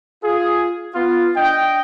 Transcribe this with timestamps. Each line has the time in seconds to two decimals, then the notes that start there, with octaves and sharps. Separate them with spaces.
0.23 F4 G#4
0.95 B3 F4
1.36 D4 D#5 G5